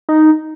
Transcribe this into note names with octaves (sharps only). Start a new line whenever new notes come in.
D#4